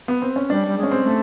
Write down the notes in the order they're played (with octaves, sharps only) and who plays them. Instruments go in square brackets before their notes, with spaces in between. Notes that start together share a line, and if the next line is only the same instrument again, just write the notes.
[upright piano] B3
C4
C#4
[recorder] G3 [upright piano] D4
[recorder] G3
G#3
[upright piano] C#4
C4
[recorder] A3